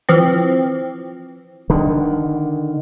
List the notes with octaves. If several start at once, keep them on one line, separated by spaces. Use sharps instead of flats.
E3 F3 C4
D3 D#3